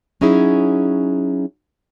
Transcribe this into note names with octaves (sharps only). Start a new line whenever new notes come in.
F#3 C#4 D#4 E4 G#4